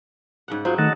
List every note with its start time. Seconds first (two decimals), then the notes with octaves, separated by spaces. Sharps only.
0.48 G#2 C#3 F#5
0.65 F#3 G#3 F4 C5
0.78 D#3 A3 D#4 D#5 F#5 A5